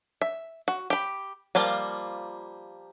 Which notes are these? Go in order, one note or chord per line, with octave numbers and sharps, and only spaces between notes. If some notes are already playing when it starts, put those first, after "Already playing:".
E5
F#4
G4 B5
F3 G3 A#3 F4